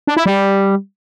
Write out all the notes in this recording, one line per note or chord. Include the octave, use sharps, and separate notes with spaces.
D4
E4
G3